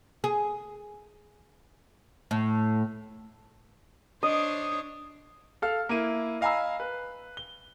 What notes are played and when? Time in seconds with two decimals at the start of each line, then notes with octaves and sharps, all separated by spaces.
0.24 G#4
2.31 A2
4.23 D4 C5 C#5 D#5
5.62 A4 F5 F6
5.89 A#3 E4 D#7
6.41 D#5 F5 G#5 A#5 B5 E6
6.80 B4
7.37 G7